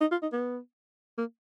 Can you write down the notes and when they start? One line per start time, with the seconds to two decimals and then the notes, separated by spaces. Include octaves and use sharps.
0.01 D#4
0.11 F4
0.22 D#4
0.33 B3
1.18 A#3